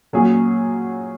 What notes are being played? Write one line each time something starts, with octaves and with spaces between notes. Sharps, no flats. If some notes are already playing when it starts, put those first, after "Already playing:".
A#2 F#3 C#4 G#4